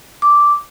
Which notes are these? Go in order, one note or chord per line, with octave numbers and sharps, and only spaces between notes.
D6